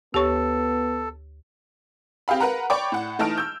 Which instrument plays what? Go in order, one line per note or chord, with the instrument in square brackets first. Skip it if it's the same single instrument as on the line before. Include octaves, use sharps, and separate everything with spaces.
[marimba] D2 A5 C#6 [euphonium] B3 [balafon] G4 C#5 [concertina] A4
[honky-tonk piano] C4 G4 G#4 F5 B5
A#4 B4 F#5 A#5
C#5 D5 G5 B5 C#6 D6
A2 F#5
E3 A3 D#4 A5 F6 D7
E6 G6